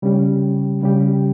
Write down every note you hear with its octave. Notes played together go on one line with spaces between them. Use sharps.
C#3 G3 C#4 G4
C#3 G3 C#4 G4